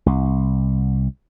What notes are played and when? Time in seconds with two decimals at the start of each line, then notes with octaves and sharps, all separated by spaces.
0.06 C2